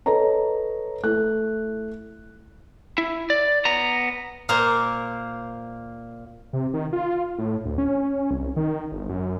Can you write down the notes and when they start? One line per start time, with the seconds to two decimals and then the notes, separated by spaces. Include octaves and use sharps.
0.06 A4 B4 C#5 D#5 A#5
1.03 A3 E4 F#6
2.98 E4
3.30 D5
3.65 B3 A#5
4.49 A#2 A#3 C5 A#5
6.53 C3
6.74 D#3
6.93 F4
7.38 A2
7.65 D2
7.78 C#4
8.31 C2
8.56 D#3
8.91 G1
9.09 F#2